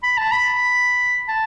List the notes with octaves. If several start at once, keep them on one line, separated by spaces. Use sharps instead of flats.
B5
A5
B5
A5